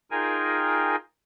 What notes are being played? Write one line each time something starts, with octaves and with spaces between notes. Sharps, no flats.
D#4 F4 G#4 A#4 G5 G#5